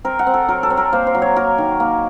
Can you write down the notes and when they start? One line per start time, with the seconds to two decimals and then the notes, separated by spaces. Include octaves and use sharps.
0.05 C4 A#4
0.19 F#5
0.27 C4
0.34 A4
0.49 F#3 A#4
0.63 A4
0.70 C4
0.77 A#4
0.93 A#3 C5
1.07 C5
1.15 F#3
1.22 C#5
1.36 A#3 A#4
1.58 D#3
1.80 A#3